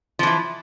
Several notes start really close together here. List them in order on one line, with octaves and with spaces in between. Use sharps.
F3 E3 E4